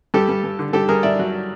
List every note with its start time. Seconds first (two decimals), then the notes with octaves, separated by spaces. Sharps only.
0.14 G2 G4 A4
0.29 G2
0.44 G2
0.59 D3
0.73 G2 G4 A4
0.89 G2 G#4 A#4
1.03 G2 D5 E5
1.19 F#3